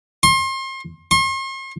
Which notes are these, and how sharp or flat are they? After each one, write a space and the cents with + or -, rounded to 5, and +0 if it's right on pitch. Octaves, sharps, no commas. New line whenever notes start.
C6 +35
C6 +45